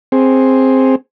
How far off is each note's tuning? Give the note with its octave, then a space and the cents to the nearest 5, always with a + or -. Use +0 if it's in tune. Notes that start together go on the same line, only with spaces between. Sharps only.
C4 +5 G#4 +0